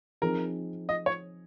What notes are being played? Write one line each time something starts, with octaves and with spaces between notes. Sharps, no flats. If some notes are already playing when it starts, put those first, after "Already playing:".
F3 C4 D#4 G#4 A#4
D#5
C#5